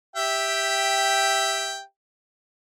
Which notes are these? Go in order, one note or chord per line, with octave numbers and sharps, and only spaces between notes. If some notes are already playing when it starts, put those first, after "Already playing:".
G4 E5 G5